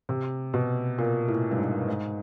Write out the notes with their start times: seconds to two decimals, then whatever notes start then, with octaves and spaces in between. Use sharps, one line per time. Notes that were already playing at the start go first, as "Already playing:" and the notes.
0.09 C3
0.54 B2
0.98 A#2
1.28 A2
1.51 G2
1.58 G#2
1.88 G#2